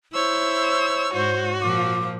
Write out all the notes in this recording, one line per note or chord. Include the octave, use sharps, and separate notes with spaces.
E4 C5 C#5 E6
G#2 F#4 C5
A#2 F3 D6